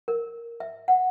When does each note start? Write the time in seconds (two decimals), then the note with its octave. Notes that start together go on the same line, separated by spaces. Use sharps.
0.08 A#4
0.60 E5
0.88 F#5